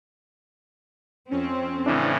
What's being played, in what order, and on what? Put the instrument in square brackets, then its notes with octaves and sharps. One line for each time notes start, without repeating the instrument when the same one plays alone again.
[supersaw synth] F2 C#4 [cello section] C4
[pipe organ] A2 C#3 E3 [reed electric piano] D4 E4 D5